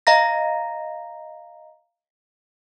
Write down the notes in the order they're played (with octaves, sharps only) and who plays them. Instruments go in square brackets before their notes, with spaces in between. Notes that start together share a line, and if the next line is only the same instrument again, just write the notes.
[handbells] D#5 F5 A#5 A#6